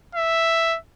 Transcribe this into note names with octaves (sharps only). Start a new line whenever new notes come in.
E5